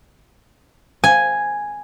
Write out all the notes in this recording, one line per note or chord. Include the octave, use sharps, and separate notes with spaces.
G#5